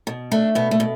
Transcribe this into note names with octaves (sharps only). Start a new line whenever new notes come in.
B2
A3 D4
B2 B3
A3
B2